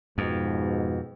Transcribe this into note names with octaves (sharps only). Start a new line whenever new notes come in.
F2 G#2 B2